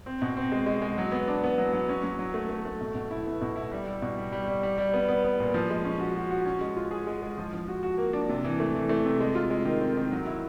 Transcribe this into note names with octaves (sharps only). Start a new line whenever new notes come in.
C4
B2
C4
G#3
G#3
G#3
F#3
B3
D4
B3
F#3
F#3
C#4
F#3
F#3
A3
A3
A3
B2
B2
E4
B3
B2
E4
G3
G3
B2
G3
G3
G3
G3
G3
B3
B3
B3
A#2
F3
G#3
C#4
F#4
F#4
F#4
C#4
G#3
F4
G#4
G#3
G#3
F3
F3
F#4
F#4
A#3
D4
C3
E3
A3
E3
A3
C3
G#3
F4
G#3
D#3
C4
D#3
F#3
E4